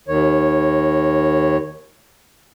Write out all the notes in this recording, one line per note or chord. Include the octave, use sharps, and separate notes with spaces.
D#2 D#3 C#5